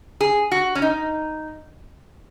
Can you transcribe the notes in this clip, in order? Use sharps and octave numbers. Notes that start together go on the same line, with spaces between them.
G#4
F#4
C#4
D#4